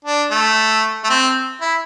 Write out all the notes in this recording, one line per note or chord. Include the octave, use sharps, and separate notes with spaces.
D4
A3
A3
C4
E4